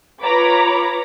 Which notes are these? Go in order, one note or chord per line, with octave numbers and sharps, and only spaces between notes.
F4 B4 C#5 A#5 B5 D6